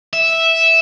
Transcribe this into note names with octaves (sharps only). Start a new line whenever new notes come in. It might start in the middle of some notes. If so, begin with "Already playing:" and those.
E5